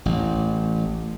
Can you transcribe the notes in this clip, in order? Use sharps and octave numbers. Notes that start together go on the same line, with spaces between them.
A1